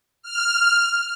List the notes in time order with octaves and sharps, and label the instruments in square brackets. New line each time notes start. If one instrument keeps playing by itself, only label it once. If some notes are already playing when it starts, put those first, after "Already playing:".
[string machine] F6